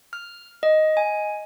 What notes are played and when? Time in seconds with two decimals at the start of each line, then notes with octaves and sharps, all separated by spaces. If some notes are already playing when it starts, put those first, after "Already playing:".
0.13 F6
0.63 D#5
0.97 G#5